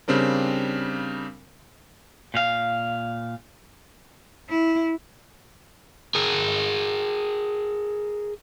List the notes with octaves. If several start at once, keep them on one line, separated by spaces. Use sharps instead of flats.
C#3 G3 C4 D4 A#4
A#2 F5
E4
G#4 A#4